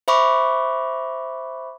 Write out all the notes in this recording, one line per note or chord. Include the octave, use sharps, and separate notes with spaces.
C5 E5 B5 C#6 D6